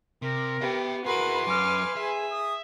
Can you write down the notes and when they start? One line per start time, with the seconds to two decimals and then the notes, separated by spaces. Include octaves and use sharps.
0.22 C3 A#4
0.61 B3 G4 E5 G5
1.06 E4 F#4 G#4 A#4 B4 B5 C6
1.47 F#2 G#5 D6 F6
1.97 G#4 E5
2.31 D#6